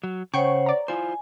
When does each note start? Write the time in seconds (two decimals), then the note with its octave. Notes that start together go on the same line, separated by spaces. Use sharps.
0.03 F#3
0.34 C#3 C5 C#5 F#5 G5 C#6
0.66 D5 A#5
0.88 E4 F4 C5 G#5